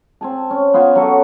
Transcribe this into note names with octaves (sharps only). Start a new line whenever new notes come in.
C4 G#5 A5
C#4
B3 F4 F5 G#5
F#3 F#4 A4